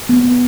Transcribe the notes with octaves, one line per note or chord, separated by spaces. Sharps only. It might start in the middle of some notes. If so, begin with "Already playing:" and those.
B3